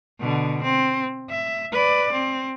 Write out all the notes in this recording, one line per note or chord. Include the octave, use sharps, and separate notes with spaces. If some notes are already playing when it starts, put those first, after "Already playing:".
B2 D3
C4
E5
B4 D5
C4